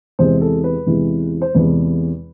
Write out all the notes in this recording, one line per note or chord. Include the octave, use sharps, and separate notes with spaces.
E2 C3 E3 G#3 C5
A4
B4
E2 C3 E3 G#3
C5
E2 C3 E3 G#3 B4